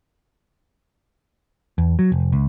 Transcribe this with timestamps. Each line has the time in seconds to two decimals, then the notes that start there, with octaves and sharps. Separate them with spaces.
1.78 E2
1.99 F#3
2.12 F1
2.32 C#2